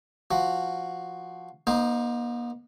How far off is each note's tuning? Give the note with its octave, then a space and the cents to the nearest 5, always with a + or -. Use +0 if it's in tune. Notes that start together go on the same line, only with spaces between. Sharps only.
F3 +0 F#4 +0
A#3 +45 D#4 +0 C5 +0